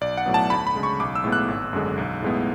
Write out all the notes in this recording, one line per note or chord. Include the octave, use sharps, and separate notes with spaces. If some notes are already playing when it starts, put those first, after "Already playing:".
B1 D5
F#5
A2 F#3 B3
A5
D2 B5
B5
C#3 G#3
C#6
B1 D6
E6
A2 G#3 B3
F#6
G#1
F#2 D3 G#3
B1
A2 G#3 B3